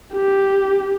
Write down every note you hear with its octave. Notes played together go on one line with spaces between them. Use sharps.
G4